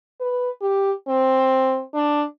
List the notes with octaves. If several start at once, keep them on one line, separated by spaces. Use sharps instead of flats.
B4
G4
C4
D4